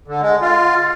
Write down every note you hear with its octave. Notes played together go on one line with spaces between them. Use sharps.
D3
G#3
F4